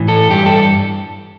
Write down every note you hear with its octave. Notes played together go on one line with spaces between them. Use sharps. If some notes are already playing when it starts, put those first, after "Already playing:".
Already playing: A2 E3
A4
G2 E3 G4
A4